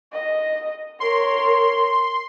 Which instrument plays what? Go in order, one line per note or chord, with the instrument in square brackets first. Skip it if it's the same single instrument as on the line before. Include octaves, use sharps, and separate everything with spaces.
[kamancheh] D#5
[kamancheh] A#4 C#5 [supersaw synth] C6